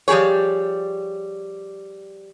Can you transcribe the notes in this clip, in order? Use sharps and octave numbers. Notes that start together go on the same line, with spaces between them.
F3 G3 G4 G#4 C#5